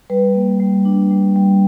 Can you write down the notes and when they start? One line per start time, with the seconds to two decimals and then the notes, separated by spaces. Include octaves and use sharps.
0.10 G3 B4
0.35 A#3
0.60 G3
0.85 D4
1.11 G3
1.36 G3